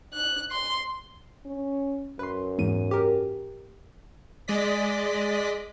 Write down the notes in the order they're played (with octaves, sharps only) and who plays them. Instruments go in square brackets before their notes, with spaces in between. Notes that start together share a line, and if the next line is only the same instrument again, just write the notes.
[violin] F#6
C6
[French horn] C#4
[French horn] F#2 [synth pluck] B4 C6
[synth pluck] E2 G#2 D#7
G4 A#4
[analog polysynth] G#3 D5 D#5 B6